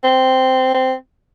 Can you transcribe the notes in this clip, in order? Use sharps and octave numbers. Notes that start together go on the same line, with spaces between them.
C4
C4